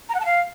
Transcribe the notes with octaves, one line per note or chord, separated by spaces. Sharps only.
A#5
F#5
A5
F5